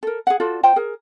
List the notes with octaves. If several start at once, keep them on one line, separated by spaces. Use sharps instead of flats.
A4 A#4
G#4 F#5
F4 F#4 A4 D5
F4 C5 G5
G#4 A#4